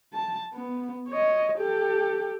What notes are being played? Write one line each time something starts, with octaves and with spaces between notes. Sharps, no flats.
A5
B3
C#5 D#5
G4 A4